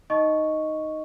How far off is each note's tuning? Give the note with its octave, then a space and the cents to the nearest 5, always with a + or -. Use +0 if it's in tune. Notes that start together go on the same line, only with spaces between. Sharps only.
D#4 +0 D#5 +0 C#6 +0